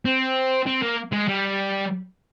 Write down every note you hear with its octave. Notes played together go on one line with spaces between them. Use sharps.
C4
C4
A#3
G#3
G3